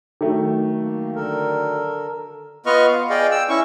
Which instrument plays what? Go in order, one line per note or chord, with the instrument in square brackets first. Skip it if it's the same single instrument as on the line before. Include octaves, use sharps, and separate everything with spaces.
[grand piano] D#3 F#3 A3
[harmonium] A#3
D3 A4 A#4
[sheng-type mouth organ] B3 F4 B4 D#5 C#6 F6
F5
G#4 D5 D#5 F5 G5
G5 E6
C#4 E4 C#6